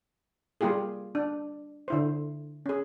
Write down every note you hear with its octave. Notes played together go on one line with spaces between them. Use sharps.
G3 A#3 F4 G4 G#4
D4
D3 E4 C5
C#4 G#4